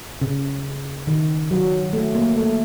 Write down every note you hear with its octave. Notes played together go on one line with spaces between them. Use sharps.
C#3
D#3
F#3
A3
A#3
A3